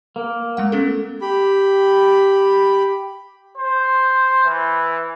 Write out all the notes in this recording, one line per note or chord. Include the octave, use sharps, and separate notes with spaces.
A#3
G#3 A3 F#5
B3 C#4 A4
G4 B5
C5
E3